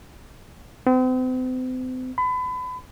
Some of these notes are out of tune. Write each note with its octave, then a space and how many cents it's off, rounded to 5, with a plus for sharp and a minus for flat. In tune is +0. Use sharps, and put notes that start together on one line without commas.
C4 -40
B5 +30